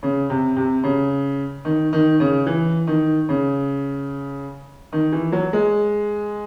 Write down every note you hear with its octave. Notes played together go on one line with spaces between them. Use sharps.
C#3
C3
C3
C#3
D#3
D#3
C#3
E3
D#3
C#3
D#3
E3
F#3
G#3